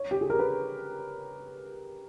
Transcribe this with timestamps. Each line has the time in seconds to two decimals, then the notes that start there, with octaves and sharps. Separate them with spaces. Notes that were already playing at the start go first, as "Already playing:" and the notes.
Already playing: C#5
0.11 G4
0.21 G#4
0.30 A#4
0.39 B4